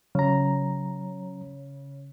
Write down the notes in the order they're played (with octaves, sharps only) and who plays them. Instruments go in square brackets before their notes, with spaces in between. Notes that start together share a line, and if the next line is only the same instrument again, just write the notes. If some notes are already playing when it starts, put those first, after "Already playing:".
[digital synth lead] C#3 [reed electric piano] F#3 A#5